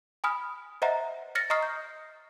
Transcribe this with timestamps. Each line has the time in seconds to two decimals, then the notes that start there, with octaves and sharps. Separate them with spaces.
0.24 G#5 B5 D#6 F6
0.82 C5 D#5 E5 F#5 A#5
1.35 F6 A6 A#6 C#7
1.50 D#5 A#5 C#6 D#6 F6 C7
1.63 G6